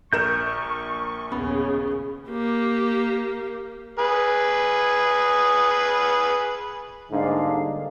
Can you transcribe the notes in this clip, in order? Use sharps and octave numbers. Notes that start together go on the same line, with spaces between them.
A#1 A#4 C#6 G6 E7
A#1 D#2 C#3 B3
A#3 G4
G#4 B4
G#2 D3 G3 A#3 D4 D#4 F5